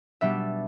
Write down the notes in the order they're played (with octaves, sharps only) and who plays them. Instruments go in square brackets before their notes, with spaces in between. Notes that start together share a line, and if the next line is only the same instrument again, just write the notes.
[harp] B2 G3 B3 D4 E5